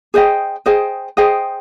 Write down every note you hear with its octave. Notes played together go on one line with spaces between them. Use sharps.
G#4 C5 D#5 G5
G#4 C5 D#5 G5
G#4 C5 D#5 G5